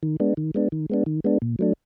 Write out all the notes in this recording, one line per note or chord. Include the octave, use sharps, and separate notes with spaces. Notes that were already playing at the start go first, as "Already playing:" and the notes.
D#3
G#3 B3 D4
D#3
G#3 B3 D4
D#3
G#3 B3 D4
D#3
G#3 B3 D4
A#2
F#3 A3 D4